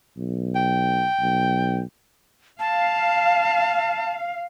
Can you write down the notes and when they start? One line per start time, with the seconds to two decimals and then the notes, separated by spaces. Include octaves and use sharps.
0.17 B1
0.55 G5
1.19 B1
2.59 F5 A5